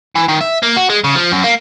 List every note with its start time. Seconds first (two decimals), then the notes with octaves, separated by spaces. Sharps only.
0.15 E3
0.28 D#3
0.41 E5
0.63 A#3
0.76 F#4
0.90 G#3
1.04 C#3
1.15 F3
1.32 F#2
1.44 A#3